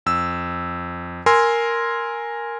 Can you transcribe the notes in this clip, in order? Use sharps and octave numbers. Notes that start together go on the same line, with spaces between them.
F2 E6
A#4 G#5 C6 E6